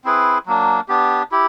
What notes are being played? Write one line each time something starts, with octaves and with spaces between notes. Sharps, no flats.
C4 E4 G#4 B4
F#3 A#3 D4
B3 D4 G4
E4 G4